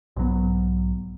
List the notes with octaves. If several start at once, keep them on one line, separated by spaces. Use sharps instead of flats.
B1 G#2 F#3 B3